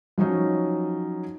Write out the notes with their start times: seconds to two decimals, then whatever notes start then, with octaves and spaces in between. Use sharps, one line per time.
0.18 F3 F#3 C#4 D#4